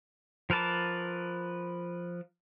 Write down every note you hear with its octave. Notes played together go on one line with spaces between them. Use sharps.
F3 A#4 B4 A5 D6